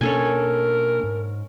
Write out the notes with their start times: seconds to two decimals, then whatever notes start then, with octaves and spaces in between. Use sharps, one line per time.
0.01 B2 A#3 C#4 D4 A4 A#4 G#5
1.04 G#2